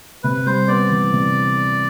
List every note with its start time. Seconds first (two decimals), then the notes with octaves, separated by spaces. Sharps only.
0.23 C3 B4
0.46 G3 C5
0.68 B3 D5
0.90 E3
1.13 C3